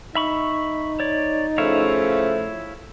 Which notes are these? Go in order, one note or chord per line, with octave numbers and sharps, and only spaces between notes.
D#4 E5 B5 C#6
C#5 D5
C#3 F3 A3 E4 C#5 F5